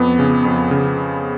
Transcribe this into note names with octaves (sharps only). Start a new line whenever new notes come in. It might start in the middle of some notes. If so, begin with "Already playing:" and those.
Already playing: F2 B3
C#3
F2
C#3